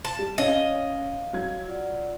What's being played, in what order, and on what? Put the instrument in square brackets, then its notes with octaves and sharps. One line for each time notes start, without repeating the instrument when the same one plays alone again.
[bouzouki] A5
[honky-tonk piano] G3
[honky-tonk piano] C#4 [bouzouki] D#5 [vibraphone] F5
[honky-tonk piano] F#3 G#6
[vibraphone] F4 D5 F#5